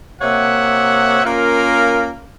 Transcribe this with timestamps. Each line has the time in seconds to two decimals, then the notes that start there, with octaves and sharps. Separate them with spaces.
0.22 C3 A#3 C#5 E5 F#5
1.25 A#3 C#4 F4 A#4 F5